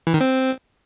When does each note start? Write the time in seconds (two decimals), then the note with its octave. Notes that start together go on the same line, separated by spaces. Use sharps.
0.07 E3
0.14 D#3
0.21 C4